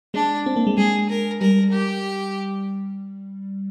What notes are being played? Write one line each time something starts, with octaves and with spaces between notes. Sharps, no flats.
G#3 D4
C4
A#3
G#3
G#3 G#4
A#4
G3 A#4
G4